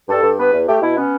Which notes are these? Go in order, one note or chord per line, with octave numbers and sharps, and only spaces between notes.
G2 A4
G2
B3 B4
E2
A3 G4
B2 E4
B3 C#4